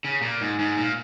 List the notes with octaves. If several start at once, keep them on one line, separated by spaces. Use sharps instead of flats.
C#3
A#2
G#2
G#2
A#2